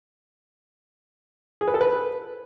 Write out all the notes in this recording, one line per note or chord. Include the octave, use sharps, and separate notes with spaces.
G#4
B4
A4
B4